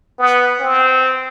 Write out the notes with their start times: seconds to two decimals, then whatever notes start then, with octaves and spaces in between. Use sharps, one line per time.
0.18 B3
0.59 C4